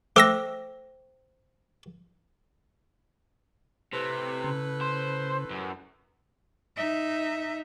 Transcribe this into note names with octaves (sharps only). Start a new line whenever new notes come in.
A3 C5 G5 D6 E6 A#6
A2 C3 A4 B4
C#3
C5
F#2
D#4 E5